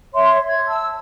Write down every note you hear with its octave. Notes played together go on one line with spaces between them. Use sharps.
C#5 E5 C6
G#6
A5 E6